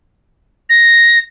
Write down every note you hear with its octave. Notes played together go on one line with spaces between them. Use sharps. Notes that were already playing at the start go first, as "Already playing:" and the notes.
A#6